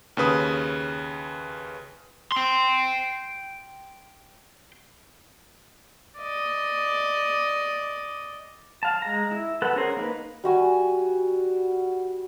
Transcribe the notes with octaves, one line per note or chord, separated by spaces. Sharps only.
D#2 C#3 B4 D#6
G5 C6
D5 D#5
F5 A5
G#3 A#5
E4
A4 B4 F#5
C#4 G#4 A#4 C5
A#3 D#4 B4
G3 F#4 G#5